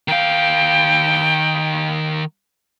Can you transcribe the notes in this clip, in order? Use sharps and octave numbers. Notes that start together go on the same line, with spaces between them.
D#3 F5 G5